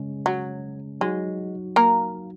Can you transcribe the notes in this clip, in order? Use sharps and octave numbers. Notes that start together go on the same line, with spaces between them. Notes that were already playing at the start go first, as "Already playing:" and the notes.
Already playing: C#3 G#3 C#4
F#3
F#3 G#3 D#4 F#4
A#3 A#4